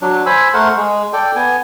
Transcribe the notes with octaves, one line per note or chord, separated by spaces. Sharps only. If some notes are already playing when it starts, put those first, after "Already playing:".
F#3 D4
C5 G#5 B5 E6
A3 A#4 C5 F#5
G#3
A4 D5 G5
B3 G#5